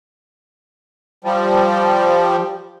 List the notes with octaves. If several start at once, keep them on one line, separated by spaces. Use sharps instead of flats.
F3 G3